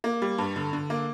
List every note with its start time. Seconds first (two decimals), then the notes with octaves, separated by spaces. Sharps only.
0.04 A#3
0.22 G3
0.38 G2
0.56 D3
0.73 D3
0.90 A#3